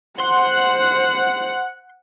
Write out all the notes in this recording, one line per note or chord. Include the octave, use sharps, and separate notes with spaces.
C5 F#5 C6